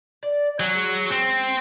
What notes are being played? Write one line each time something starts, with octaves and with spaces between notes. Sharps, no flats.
D5
F#3 G#5
G#3
C4